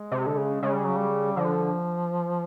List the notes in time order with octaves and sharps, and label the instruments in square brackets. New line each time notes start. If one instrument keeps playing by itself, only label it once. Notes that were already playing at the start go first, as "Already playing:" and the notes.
Already playing: [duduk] G#3
[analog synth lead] C3
D3
C#3
[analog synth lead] C#3 [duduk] G#3
[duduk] G3
F#3
G3
[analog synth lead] D3 [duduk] F3